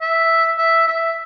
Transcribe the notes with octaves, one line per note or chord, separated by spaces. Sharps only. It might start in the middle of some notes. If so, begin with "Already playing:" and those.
E5
E5
E5